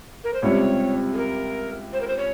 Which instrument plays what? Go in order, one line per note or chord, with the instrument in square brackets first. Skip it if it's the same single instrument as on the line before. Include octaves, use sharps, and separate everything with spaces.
[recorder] A#4
C5
[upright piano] C#2 C3 G3 C4 [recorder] C#5
[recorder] G#4
A#4
C5
A#4
C5
C#5